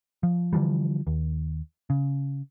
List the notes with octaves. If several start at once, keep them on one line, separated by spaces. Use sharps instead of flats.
F3
D3 E3 F3 G3
D#2
C#3